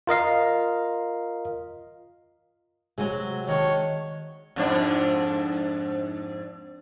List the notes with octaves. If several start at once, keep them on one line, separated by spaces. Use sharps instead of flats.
F4 A#4 D#5 F5
C3 F#3 G#3 F#4
D#3 D4 C#5
F2 G#2 D4